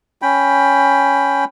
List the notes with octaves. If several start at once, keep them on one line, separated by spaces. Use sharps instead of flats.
C#4 G5 B5